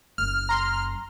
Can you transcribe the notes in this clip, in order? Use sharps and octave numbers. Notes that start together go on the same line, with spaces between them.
F#1 F#2 F6
A#5 C6